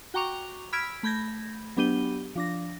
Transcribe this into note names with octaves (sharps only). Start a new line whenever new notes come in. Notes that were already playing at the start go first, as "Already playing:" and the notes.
F#4 G5 A#5 C#6 D6 F7
B5 E6 F6 G#6 B6 D7
A3 B5 G6 G#6 A#6
F#3 B3 D4 G4 D#7 G7
F3 D4 A#6